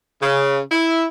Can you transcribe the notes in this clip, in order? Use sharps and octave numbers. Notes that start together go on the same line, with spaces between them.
C#3
E4